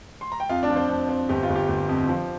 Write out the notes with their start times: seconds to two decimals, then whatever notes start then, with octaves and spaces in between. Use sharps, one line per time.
0.21 C6
0.32 A#5
0.40 G5
0.49 F2 F4 F5
0.63 D4 D5
0.70 F3
0.76 C4 C5
0.89 F2
1.09 C4
1.29 G1 G4
1.43 F4
1.49 G1
1.56 G4
1.68 G1
1.89 F2
2.09 F3